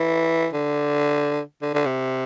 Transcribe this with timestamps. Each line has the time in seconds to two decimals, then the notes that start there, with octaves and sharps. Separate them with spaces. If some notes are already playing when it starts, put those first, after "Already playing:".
Already playing: E3
0.53 D3
1.62 D3
1.74 D3
1.86 C3